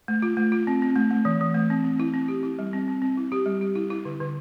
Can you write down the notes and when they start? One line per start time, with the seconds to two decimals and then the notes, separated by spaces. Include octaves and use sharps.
0.08 A3
0.22 F4
0.37 A3
0.52 F4
0.67 C4
0.82 C4
0.96 A3
1.11 A3
1.25 E3
1.41 E3
1.54 A3
1.70 C4
1.84 C4
2.00 E4
2.14 C4
2.28 G4
2.43 E4
2.59 G3
2.73 C4
2.88 C4
3.02 C4
3.17 E4
3.32 G4
3.46 G3
3.61 G4
3.75 E4
3.90 E4
4.05 D3
4.20 D3